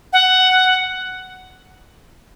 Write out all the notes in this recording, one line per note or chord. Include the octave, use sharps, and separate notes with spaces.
F#5